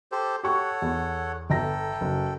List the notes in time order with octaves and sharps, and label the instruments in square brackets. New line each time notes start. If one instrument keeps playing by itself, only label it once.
[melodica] G4 A4 C5
[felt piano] G4 C#6 [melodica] A4 C#5 F#5
[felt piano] E2
[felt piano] G1 A#6 [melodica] A4 G5
[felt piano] F#1